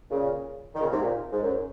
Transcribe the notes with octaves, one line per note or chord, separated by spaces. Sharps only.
A#2 C#3
D#3
A#2 C#3
G#2 C3
A#2
G#2
F#2